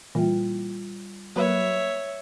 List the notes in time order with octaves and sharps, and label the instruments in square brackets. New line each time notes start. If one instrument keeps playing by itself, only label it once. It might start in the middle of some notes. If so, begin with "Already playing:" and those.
[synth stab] A#2 E3 [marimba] G3 F4 G5
[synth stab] F#3 A#3 B4 [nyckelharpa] C#5 E5